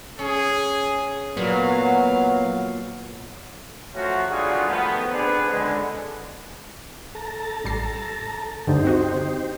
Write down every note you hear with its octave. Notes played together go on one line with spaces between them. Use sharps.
C#4 G#4
A#2 F#3 B3 F5
F3 F#3 A3 C#4 F#4
G#1 D3 G3 F4 F#4 G#4
D#3 F3 A3 B3
B3 C4 D4 G#4 B4
C#2 D3 G#3
A4 A5 A#5
A1 G3 C7
D2 G2 D3 D#4 G4 C5
C4 F#4 D#5